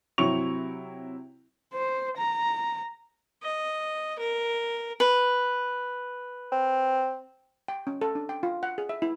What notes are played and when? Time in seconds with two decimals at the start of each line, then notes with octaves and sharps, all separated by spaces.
0.18 C3 F#3 C4 E4 C#6 F7
1.74 C5
2.18 A#5
3.43 D#5
4.18 A#4
5.00 B4
6.52 C4
7.68 G5
7.87 C#4
8.01 A4
8.15 D4
8.29 G5
8.43 F4
8.63 F#5
8.78 G#4
8.89 E5
9.02 E4